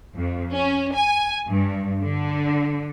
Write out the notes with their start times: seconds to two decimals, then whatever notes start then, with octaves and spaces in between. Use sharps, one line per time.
0.16 F2
0.52 C#4
0.95 G#5
1.48 G2
2.02 D3